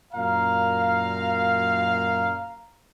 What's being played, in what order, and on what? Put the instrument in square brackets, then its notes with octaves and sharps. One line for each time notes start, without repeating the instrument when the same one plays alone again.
[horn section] F#2 A#2 F5 [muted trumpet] A#5